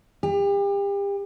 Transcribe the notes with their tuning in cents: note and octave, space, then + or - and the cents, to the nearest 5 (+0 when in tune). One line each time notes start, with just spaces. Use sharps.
G4 +35